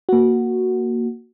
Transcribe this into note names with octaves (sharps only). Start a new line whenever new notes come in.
A#3 F#4